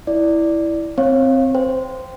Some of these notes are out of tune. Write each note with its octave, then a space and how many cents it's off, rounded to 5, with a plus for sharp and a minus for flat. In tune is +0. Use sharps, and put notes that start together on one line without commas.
E4 -5 D5 +0
C4 +0 C#5 -30 F5 +0
C5 -15 G5 -5